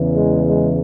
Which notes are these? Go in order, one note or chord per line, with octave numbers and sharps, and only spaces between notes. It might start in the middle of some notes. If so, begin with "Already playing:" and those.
Already playing: E2 C#3 E3
G#3
G#3